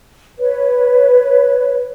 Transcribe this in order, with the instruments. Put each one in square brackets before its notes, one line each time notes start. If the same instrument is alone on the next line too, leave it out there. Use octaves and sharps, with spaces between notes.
[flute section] B4 C#5